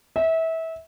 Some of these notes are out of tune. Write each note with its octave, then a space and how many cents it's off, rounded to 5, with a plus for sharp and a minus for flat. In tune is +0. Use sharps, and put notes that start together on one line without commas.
E5 -25